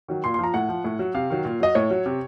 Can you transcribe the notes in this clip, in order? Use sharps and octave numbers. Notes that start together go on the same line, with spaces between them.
D#3 F#3
A#2 C6
C6
F3 A#5
A2 F#5
F3
A2
F#3
C3 F5
D#3 F#3
A#2
F#3 D#5
A2 C#5
F#3
C3